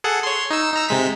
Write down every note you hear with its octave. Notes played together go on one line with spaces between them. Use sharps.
G#4 A4 F#5
C#5 C6
D#4 E6
D#4 A#5 E6
C3 G#3 B6